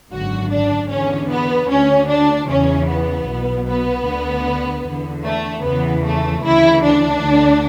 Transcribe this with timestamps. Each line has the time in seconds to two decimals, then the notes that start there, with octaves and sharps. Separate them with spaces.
0.12 G#1 F#2 D3 F#4
0.50 D4
0.90 E2 D3 C#4
1.30 B3
1.70 D2 D3 C#4
2.09 D4
2.48 E2 C#3 E3 C#4
2.88 B3
3.27 B1 B2
3.67 B3
4.07 D2 D3
4.86 E2 D3
5.25 A3
5.64 E2 C#3 E3 B3
6.04 A3
6.43 D2 C#3 E3 E4
6.83 D4
7.23 D2 D3